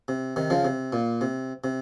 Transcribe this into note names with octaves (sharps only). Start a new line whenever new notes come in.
C3
C3 D#3
C#3 F3
C3
A#2
C3
C3